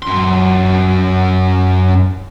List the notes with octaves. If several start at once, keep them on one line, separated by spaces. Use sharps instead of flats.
F#2 C6